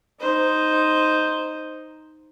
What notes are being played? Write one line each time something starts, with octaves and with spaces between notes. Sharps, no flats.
D#4 C5